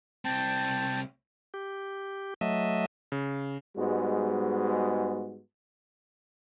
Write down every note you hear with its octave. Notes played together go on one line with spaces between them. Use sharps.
C2 C4 G5 A5
G4
F#3 A3 D#5 E5
C#3
G#2 G3 G#3 B3 F#4